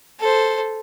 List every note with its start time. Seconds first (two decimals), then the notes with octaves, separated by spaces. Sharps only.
0.20 A4 C5